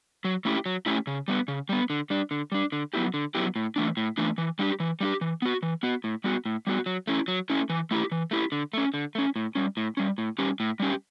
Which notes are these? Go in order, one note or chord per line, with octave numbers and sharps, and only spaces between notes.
F#3
A3 C#4 E4 G4
F#3
A3 C#4 E4 G4
C#3
G3 B3
C#3
G3 B3
D3
G3 D4
D3
G3 D4
D3
F#3 B3 E4 G4
D3
F#3 B3 E4 G4
A2
E3 A3 D4
A2
E3 A3 D4
E3
G3 D4 G4
E3
G3 D4 G4
E3
B3 F#4
E3
B3 F#4
A2
G3 B3 F#4
A2
G3 B3 F#4
F#3
A3 C#4 E4
F#3
A3 C#4 E4
E3
A3 E4 G4
E3
A3 E4 G4
D3
A3 C#4
D3
A3 C#4
A2
G3 C#4
A2
G3 C#4
A2
G3 C#4 G4
A2
G3 C#4 G4